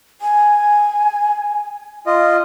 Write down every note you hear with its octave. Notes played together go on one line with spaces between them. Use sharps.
G#5
F4 D#5